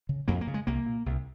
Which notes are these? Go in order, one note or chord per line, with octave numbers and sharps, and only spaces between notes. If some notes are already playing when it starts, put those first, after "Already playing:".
C#3
F2 A#3
A#3
C#3
G#3
C2 A#3
A#2
C2